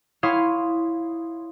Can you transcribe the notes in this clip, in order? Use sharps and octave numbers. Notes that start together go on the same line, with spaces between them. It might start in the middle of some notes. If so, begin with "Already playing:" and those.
E4 C#5 F5 C6 D#6